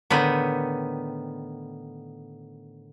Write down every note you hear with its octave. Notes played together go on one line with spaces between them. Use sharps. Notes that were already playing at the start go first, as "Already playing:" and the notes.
A2 D3 D#3 B3